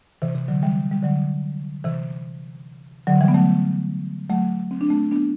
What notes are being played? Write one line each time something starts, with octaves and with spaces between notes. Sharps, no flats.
C3 E3
C3
D3 F#3
E3 G3
G3
D3 F#3
C3 E3
D3 F#3
E3 G3
B3
F#3 A3
F#3 A3
C4
D4
A3 C4
B3 D4